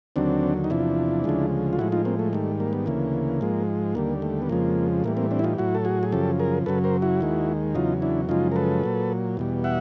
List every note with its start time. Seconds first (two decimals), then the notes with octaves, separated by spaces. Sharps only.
0.16 D#2 D3 F#3 C4 D4
0.64 D#4
0.70 E2 C3 F3 D4 E4
1.24 D2 C#3 F3 G#3
1.73 F4
1.79 A2 F3 G#3 E4 F#4
1.92 D#4 F4
2.05 A#3 C4
2.19 A3
2.33 G#2 D#3 G3 A3
2.60 A#3
2.73 B3
2.86 D2 C#3 E3 A#3
3.41 G#2 F3 G#3
3.95 D#2 D3 G3 A#3
4.22 A3
4.42 B3
4.49 F2 C#3 F3 G#3 A#3
5.04 A2 E3 G3 A#3
5.17 A#3 C4
5.31 C4 D4
5.39 E4
5.44 D#4 F4
5.58 A2 F#3 E4 F#4
5.75 A4
5.85 F#4 G#4
6.03 G#4
6.12 F#2 C#3 F3 G4 A4
6.39 G#4 A#4
6.66 F#2 C#3 F#3 A4 B4
6.84 A#4 C5
7.02 E4 F#4
7.21 D#2 D#3 G#3
7.75 E2 C#3 F#3 D#4 F4
8.02 D4 E4
8.29 F#2 C#3 F3 G#3 D#4 F4
8.52 A#4
8.56 A4 B4
8.84 A#2 F#3
9.37 E2 B2 G3
9.64 E5 F#5